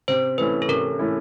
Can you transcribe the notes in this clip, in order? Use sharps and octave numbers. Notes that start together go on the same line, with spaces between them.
C3 C5
E3 A3 C#4 E4 B4
A4
C3 A#4
E3 A3 C#4 E4